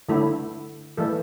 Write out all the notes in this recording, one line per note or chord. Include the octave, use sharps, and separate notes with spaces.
D3 A3 E4
E3 A3 A4